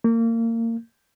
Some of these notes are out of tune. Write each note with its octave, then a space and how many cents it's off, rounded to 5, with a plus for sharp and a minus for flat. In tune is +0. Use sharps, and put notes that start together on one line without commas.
A#3 -30